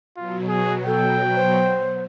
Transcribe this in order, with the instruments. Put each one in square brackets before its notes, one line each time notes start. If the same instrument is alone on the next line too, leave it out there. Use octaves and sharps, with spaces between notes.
[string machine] B2 F#3 [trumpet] F4
[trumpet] G#4
[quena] A4 [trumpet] G5
[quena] C5